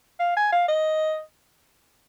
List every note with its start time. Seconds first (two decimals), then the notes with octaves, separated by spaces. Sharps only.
0.20 F5
0.37 G#5
0.52 F5
0.68 D#5